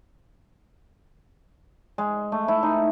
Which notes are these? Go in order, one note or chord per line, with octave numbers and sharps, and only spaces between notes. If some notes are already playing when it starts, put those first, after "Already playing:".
G#3
A3
E4
D#4